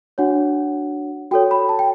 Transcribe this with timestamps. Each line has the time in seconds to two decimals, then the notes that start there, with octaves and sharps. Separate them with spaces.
0.18 D4 F#4 C#5 F#5
1.31 F#4 A4 C#5 G5
1.51 B5
1.69 A5
1.79 G5